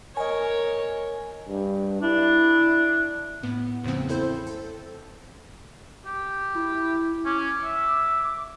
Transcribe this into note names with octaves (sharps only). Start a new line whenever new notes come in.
A#4 C#5 D#5 G#5
G2
D4 E4
A2 B3
E2 A2 C#3 F3 C4
C4 E4 A4 C5 G6
A4
G4
E4
C#4 D6
E5